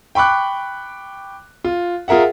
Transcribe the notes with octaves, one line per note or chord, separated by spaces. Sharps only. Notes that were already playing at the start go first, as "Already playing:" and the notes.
G5 B5 C#6 D6 F#6
F4
F4 G#4 A#4 E5 F#5